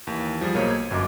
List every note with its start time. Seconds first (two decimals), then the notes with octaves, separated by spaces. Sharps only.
0.07 D#2 E3
0.41 F3 G3 G#4
0.55 B1 A#3 C5 C#5 D#7
0.71 G#6
0.91 G1 F#2 D#5 D6